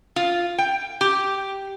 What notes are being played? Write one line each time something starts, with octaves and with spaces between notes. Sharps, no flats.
F4
G5
G4